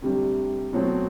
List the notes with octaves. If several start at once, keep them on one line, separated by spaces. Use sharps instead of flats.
D2 C3 G3
B2 F#3 A3 C4